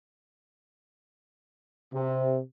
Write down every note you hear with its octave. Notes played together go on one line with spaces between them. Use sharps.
C3